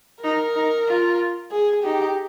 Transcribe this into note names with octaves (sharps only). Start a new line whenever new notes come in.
D#4 A#4
D#4
F4
G#4
D#4 G4